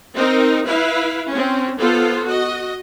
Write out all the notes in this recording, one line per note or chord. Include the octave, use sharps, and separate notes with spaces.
C4 D#4 A#4
E4 B4 F5
C4 C#4
B3 F4 A4 C5
F#4 D#5